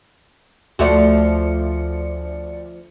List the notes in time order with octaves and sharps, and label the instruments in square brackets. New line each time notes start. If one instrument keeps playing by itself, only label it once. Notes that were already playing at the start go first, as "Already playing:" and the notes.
[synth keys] D2 D5 C#7 [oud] F3 A3 F#4